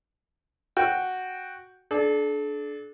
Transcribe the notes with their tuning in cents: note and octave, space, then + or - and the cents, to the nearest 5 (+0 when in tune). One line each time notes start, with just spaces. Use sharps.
F#4 +0 G5 +0
D4 +5 A4 -45